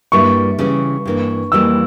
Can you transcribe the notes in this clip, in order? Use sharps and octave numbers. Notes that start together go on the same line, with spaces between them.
G2 G3 A#3 E4 C#6
C#3 E3 G3 C#4
G2 E3 A#3
F2 E3 G3 A#3 E6